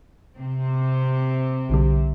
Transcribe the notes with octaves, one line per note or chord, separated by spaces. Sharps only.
C3 C4
B1 D3 G3